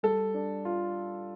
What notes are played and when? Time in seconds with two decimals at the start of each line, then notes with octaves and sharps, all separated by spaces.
0.03 G3 A4
0.34 D4
0.65 F4